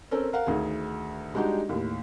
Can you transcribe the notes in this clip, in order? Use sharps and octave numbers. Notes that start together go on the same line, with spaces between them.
C4 C#4 A4 A#4
A#4 F5 F#5
D2 D#3 G#4
G3 G#3 D4 D#4 F#4 G4
D#2 A2